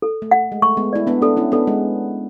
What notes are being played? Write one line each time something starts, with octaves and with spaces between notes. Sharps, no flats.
A4
A3
F#5
G#3
A3 C#6
G#3 B3
E4 D5
B3 D4
B3 D4 A4
C#4 E4
B3 D4 A4
G#3